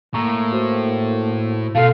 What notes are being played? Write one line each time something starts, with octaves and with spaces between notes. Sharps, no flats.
A2 A#3 A#5 C#6
F#4 C5
B2 A3 F4 A4 F5